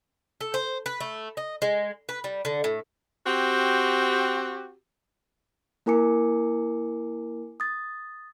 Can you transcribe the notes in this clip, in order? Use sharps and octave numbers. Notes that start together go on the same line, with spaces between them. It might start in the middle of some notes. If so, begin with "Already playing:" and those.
A4
C5
B4
A3
D#5
G#3
B4
G3
D3
A2
C4 F#4 G4
A#3 E4 A#4 G#5 D6 C#7
D#6 A6